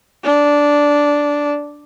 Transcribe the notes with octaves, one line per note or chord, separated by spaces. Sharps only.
D4